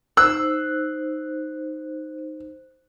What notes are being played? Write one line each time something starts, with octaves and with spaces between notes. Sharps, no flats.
D#4 C5 E6 F#6